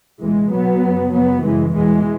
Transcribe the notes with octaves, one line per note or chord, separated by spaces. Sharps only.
C#2 B2 E3 G#3
C#2 B2 F#3 B3
F#2 C#3
F#2 C#3 F#3 B3
F#2 C#3 E3 G#3
E2 B2 E3 G#3